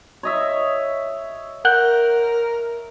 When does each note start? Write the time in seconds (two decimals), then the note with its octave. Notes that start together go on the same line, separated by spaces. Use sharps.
0.23 C#5 D#5 E5
1.65 A#4 F#5 F#6 G6